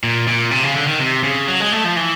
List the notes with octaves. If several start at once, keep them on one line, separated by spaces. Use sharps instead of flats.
A#2
A#2
C3
C#3
D3
D#3
C3
C#3
F#3
G#3
A3
F3
E3